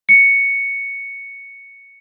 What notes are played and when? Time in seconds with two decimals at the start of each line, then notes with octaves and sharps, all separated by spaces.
0.09 C#7